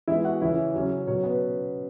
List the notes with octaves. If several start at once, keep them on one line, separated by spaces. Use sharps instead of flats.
E3 G#3 B3 E4 E5
F#4 F#5
C#3 E3 C#4 E4 E5
C#3 F#3 C#4
B2 F#3 C#4 C#5
B3 B4